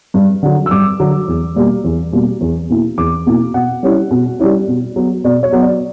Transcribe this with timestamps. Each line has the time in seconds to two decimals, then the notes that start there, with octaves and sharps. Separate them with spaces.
0.14 G2
0.43 D3 F#3
0.66 E6
0.71 G2 D6
1.00 D3 F#3
1.28 E2
1.56 B2 G3 A#3
1.84 E2
2.13 B2 G3 A#3
2.41 E2
2.69 B2 A#3 E4
2.98 E2 D6
3.26 B2 A#3 E4
3.54 B2 F#5
3.83 G3 C#4 E4
4.11 B2
4.39 G3 C#4 E4
4.68 B2
4.96 F#3 B3
5.24 B2 D5
5.43 C#5
5.52 F#3 B3
5.62 D5